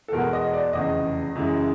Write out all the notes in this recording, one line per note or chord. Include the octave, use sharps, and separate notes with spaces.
A4
E2 B2 G#3 A#4
D#5
D5
F1 E2 C#3 D#5
F#2 C#3 E3 G#3